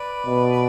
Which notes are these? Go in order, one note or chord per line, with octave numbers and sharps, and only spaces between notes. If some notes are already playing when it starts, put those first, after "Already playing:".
Already playing: B4 D5
B2